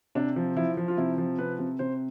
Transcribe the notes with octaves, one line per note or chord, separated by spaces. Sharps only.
C3 D4
F3
F3 E4
F3
F4
C3 E4
F3
C3 B4
C3
C3 C5